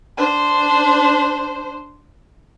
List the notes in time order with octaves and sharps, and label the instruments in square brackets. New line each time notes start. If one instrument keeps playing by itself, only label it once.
[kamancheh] D4 C5